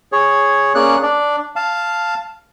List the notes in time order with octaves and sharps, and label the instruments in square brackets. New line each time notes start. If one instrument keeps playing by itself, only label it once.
[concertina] G#4 C#5
A#3 C#4 G#4 D5 F#6
D4 D5
F5 A5